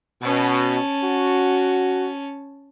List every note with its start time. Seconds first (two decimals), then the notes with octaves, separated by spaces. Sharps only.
0.22 B2 C#4 A5
1.03 F#4